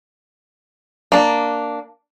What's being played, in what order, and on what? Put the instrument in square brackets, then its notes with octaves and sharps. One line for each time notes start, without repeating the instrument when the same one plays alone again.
[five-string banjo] A#3 D4